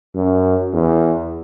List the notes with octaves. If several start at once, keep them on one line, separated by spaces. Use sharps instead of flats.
F#2
E2